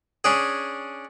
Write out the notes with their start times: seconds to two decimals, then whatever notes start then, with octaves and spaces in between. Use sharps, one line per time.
0.24 C#4 D4 G#4